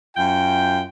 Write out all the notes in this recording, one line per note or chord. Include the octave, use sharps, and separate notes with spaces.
F#2 F4 G5